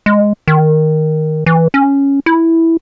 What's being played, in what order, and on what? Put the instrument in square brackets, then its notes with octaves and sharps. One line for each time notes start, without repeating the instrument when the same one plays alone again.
[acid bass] G#3
D#3
E3
C#4
E4